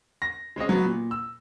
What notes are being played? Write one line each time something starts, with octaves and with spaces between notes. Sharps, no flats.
A#6
G#3 C4 C#4 D#5
F#3 B3 F#4
A#2
E6